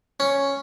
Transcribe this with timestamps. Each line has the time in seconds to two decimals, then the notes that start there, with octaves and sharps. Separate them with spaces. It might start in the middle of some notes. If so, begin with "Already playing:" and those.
0.20 C#4